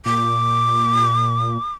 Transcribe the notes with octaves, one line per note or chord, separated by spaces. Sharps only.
A#2 D6